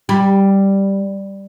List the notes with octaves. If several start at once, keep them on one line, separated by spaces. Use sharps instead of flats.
G3